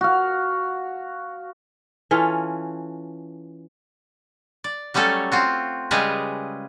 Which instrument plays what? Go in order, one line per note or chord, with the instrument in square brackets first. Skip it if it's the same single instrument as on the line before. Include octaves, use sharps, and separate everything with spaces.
[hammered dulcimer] F#4 F5
[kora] E3 C#4 F4 A4
[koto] D5
F#3 G3 A3 C#4 A4
C4 F4 F#4
C#3 G3 G#3 G#4 A#4 B4